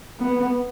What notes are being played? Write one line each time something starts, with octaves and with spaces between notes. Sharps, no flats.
B3